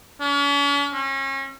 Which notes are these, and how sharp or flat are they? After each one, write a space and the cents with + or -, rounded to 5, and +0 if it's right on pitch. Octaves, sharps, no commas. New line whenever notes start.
C#4 +45
C#4 -35